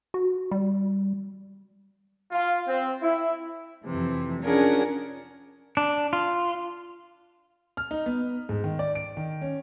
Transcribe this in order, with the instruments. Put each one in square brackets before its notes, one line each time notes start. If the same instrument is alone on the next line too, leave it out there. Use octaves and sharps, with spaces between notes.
[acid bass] F#4
G3
[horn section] F4
C4
E4
[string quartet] F2 C3 E3
C#4 D4 F4 G#4 A#4 F#5
[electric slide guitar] D4
F4
[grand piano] F6
D#4
B3
G#2
D#3
D5
D7
D#3
C#4